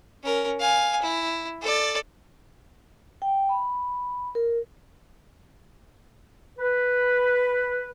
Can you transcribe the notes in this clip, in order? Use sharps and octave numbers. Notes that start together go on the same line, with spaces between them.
C#4 A#4
F5 G#5
E4
A4 D5
G5
B5
A#4
B4